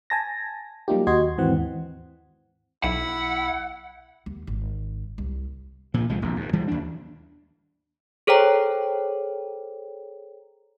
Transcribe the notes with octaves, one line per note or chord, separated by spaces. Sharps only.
G#5 A5 A#6
F#3 G3 A#3 D#4 F4 G4
D#2 F#4 D#5 C6 G#6
D#2 G#2 E3 C4 F#5
B1 E4 F#5 B5
D#2
G#1
C2
A#2 F3
C2 F3 G#3
E1 A#1 D#2
D#2 G#2
E3 G3 G#3
D#2 D4
G#4 A4 C5 C#5 G5 A#5